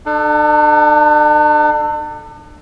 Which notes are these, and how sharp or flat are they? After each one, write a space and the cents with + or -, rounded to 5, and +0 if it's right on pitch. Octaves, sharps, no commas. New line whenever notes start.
D4 +40 A4 +0